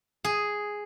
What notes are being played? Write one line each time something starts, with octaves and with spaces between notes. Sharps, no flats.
G#4